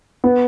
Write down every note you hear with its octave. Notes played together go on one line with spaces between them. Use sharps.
B3